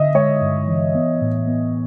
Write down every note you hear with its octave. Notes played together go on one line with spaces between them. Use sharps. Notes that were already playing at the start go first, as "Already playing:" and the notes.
Already playing: D3 D#5 E5
G#3 C#5
G2
E3
B3
A2
B3